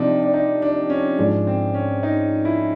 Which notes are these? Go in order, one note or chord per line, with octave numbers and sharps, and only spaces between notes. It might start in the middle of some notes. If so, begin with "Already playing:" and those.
Already playing: C3 F3 D4 D#4
D4
D#4
D4
C#4
G#2 F3 G#3 D4
C4
C#4
D#4
E4